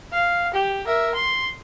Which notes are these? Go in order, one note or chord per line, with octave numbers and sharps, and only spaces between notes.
F5
G4
A#4 E5
C6